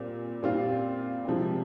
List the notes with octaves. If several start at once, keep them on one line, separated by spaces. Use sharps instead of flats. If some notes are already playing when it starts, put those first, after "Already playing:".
Already playing: A#2 G3 C4
A#2 G3 C4 F4
C3 F3 G#3 C4